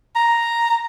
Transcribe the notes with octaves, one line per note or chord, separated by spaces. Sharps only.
A#5